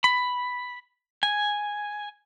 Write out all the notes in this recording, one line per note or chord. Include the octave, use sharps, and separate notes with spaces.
B5
G#5